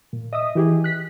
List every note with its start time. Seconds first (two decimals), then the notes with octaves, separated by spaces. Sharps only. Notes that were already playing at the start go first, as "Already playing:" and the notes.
0.13 A#2
0.33 D#5 E5 D#6
0.55 E3 G4 G#4
0.84 F#6 B6